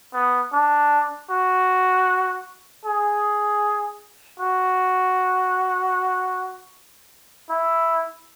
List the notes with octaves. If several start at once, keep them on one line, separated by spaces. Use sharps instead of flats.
B3
D4
F#4
G#4
F#4
E4